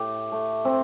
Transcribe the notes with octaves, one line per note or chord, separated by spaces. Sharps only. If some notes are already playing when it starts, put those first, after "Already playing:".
Already playing: A2 G4
A3
C4